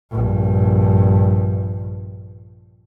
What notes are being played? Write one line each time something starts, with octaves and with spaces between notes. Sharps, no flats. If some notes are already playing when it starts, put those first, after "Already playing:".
A#1 G2